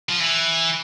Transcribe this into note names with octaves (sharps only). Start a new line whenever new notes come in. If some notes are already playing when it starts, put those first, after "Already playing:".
F3
E3